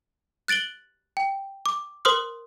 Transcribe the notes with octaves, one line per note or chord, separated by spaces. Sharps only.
F#6 A6 D7 F#7 G7
G5
D6
A#4 C5 C6 D#6 F6